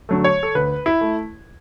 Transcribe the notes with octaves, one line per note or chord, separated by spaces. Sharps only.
D3 F#3 A3
C#5
A4
D2 B4
E4
A3